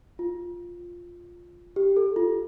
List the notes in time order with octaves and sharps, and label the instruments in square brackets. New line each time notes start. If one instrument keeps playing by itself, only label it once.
[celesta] F4
G4
A4
F4